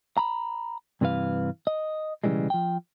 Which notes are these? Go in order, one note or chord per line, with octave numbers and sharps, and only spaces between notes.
A#5 B5
G2 C3 E3 B4 F5
D#5
B1 C#3 E3 G3 G#3
F3 G5